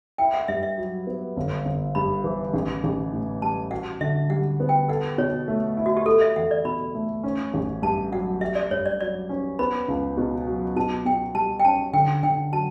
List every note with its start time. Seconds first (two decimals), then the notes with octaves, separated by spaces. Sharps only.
0.18 E4 G5
0.34 F#5
0.48 G2 E5
0.63 E5
0.78 F#3
1.07 B3
1.37 G1
1.65 G1
1.95 G2 B5
2.24 E3
2.54 A1
2.84 A1
3.12 A2
3.42 G3 A5
3.71 F#4 F#5
4.01 D3 E5
4.30 G3 F#5
4.60 B3
4.69 G5
4.88 A4 F#5
5.18 B2 C#5
5.48 A3
5.77 E4
5.86 F#4
5.97 G4
6.06 E4 A4
6.21 E5
6.36 E2 F#5
6.51 D5
6.65 B2 B5
6.94 A3
7.23 C#4
7.54 A1
7.82 G2 A5
8.12 F#3 F#5
8.41 G4 E5
8.55 D5
8.71 G2 C#5
8.86 D5
9.01 F#3 D5
9.29 C#4
9.59 B3 B5
9.88 C#2
10.17 B2
10.47 F#3
10.76 B2 A5
11.05 B2 G5
11.35 G3 A5
11.60 G5
11.65 C#4 A5
11.93 D3 G5
12.23 D3 G5
12.52 F#3 A5